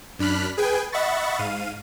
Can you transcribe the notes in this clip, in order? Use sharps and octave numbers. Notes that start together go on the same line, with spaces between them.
F#2 D4 B5 F6 F#6 B6
G#4 B4 G5 G#5
D#5 E5 F#5 B5 C#6 A6
G#2 F5 D#7